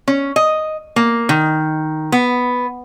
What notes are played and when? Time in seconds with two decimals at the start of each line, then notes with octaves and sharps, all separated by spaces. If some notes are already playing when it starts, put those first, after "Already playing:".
0.08 C#4
0.36 D#5
0.96 A#3
1.29 D#3
2.12 B3